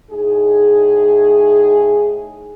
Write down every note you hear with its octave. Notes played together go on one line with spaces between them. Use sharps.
A2 D#4 G#4